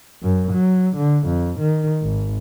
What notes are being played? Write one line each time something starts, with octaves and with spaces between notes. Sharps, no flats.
F#2
F#3
D3
F2
D#3
G#1